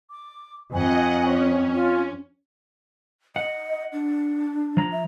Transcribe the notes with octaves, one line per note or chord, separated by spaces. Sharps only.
D6
F2 D#5 F#5 G#5
C#4 C#5
F4
D#5 F#5
D4
F3 A#5
E5